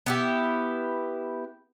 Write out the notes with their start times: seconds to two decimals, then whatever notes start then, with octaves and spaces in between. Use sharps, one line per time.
0.06 B3 E4 G4